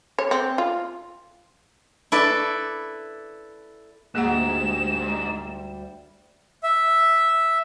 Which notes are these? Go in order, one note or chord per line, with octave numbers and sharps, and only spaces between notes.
C#5
C4
F4
E4 A4 B4 D5
D2 G#2 G3 A#3 G#4 F#5 E7
E5